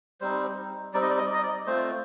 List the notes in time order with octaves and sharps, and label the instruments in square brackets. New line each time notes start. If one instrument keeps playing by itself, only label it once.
[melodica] G3 C4 D#4 C5
G3 C4 D#4 D5
D#5
D5
D#5
D5
D#5
D5
A3 C4 F4 C5